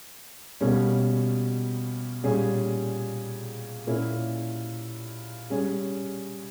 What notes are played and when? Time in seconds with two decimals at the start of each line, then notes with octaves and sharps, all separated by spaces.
0.61 B2 G3 A#3 C#4
2.24 A#2 G3 C#4 G#4
3.87 A#2 A#3 C#4 E4
5.50 G3 C#4 G#4